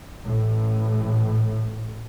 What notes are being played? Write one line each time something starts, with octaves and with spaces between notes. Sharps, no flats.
A1 A2